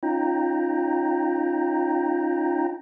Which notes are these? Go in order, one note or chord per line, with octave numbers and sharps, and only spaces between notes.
C#4 D#4 F4 G5 A#5